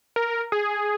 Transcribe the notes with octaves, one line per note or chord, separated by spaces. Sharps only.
A#4
G#4